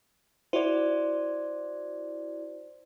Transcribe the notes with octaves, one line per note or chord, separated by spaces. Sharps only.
E4 F#4 C5 D5